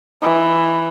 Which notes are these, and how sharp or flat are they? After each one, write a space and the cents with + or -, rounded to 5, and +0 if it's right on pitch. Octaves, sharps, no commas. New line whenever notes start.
E3 +5